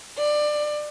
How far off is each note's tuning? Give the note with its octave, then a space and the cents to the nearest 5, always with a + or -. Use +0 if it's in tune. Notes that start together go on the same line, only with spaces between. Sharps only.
D5 +20